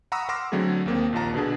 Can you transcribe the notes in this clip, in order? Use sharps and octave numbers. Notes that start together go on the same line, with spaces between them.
F#5 A#5 B5 C#6 D#6 E6
F#5 C6 D6 E6 F6 A#6
D3 F#3 A3 C4 G#4
D#2 A#3 C4
A#1 D#2 F4 A5 A#5
B2 D3 D4 G#4